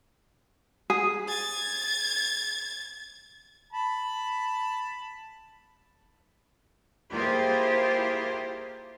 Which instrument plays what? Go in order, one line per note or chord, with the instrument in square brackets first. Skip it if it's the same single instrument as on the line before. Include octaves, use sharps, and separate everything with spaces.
[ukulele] G#4
[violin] G#6 A6
[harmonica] A5 B5
[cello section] A#3 E4 F4 G4 G#4 C5